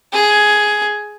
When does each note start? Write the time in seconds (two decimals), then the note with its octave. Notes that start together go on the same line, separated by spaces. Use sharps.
0.13 G#4